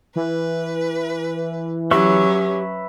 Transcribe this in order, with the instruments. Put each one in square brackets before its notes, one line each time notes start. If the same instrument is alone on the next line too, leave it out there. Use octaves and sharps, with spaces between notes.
[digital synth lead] E3 [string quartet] B4
[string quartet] F#3 C#4 [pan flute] G4 [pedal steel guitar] B4 E5 C#6